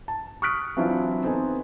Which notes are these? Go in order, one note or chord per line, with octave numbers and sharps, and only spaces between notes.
A5
C#6 D#6 F6 F#6 B6 D7
E3 F#3 C4 D4 E4 F4
B3 C4 D#4 A4 G#5